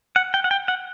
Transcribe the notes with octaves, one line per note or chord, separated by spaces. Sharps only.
F#5
G5
F#5
G5
F#5